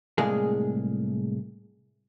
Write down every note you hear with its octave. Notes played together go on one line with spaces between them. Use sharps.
C2 A2 G#3 A#3 G#4